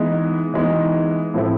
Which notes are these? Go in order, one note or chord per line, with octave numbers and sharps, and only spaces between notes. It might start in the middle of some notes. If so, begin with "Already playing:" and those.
Already playing: E3 G#3 B3 D#4
E3 G#3 B3 D#4
A2 F3 A3 C4 E4